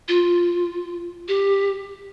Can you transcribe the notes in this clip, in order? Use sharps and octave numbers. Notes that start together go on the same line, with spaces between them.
F4
G4